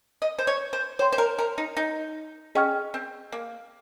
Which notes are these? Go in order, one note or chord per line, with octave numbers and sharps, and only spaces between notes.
D#5
C5
C#5
C5
C5 C#5 G5 C6
C5
A#4
A#4
D#4
D#4
C#4 G#4 D#5 G5 C#6 F6
C4
A#3